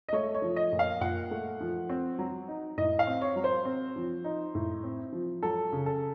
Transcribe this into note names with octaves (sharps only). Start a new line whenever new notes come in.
D#5
A3 C#5
C#5
F3
D#5
A#2
F5
A#2 F#5
A3
F3
C4
F#3
D#4
A2 D#5
F5
C4
C#5
F#3
C5
C4
F3
D#4
A2
C4
F3
F#3 A4
C#3
A4